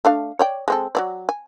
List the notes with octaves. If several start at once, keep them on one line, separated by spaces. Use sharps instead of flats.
A3 D4 F5
C#5 D5 G5
G#3 C4 A4
F#3 C4 D5
G#5